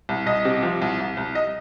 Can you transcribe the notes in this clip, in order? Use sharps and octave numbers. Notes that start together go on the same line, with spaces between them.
C2
C2 D#5
C3
F3
C2
C2
C2
D#5